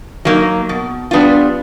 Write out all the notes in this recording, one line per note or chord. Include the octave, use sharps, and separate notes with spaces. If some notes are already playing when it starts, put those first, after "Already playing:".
F#3 A#3 D#4
B2
G3 B3 D4 F4